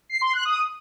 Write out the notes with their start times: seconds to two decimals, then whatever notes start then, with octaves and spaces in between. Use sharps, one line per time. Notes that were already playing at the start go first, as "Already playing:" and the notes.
0.09 C7
0.21 C6
0.33 F#6
0.45 D#6